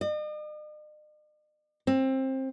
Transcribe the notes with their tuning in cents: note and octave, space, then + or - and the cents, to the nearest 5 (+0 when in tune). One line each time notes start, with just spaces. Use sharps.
D#5 -45
C4 +20